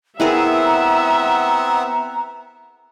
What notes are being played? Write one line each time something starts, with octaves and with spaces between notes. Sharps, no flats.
B3 C4 E4 G#4 A#4 E5 F#5 A#5